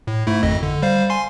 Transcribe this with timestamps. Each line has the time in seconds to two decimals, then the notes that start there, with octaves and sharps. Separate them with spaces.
0.07 A2
0.27 G#2 A3 E4
0.43 G#1 F2 D#5
0.63 D3
0.82 G3 C5 F5
1.10 G#5 C6 C7